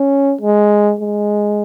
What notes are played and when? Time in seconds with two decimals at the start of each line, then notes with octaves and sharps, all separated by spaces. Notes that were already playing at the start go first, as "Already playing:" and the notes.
Already playing: C#4
0.41 G#3
1.00 G#3